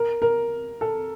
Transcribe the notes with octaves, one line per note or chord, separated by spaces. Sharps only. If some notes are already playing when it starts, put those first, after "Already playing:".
Already playing: A#4
A#4
A4